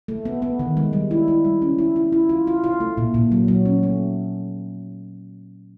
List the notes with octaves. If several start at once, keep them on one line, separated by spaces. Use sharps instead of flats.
A3
B3
B3
D#3
G#3
G3
E4
E4
G3
C#4
E4
E4
E4
F4
F4
F4
A3
A#2
A#2
F#3
F#3
C#4
A3